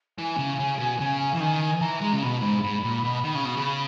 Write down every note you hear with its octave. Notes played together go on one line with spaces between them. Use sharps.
E3 G#5
C#3
C#3
B2
C#3
E3
D#3
E3 A#5
G#3
C#3
B2 B5
G#2
G#2
A#2
B2
D#3
C#3
B2
C#3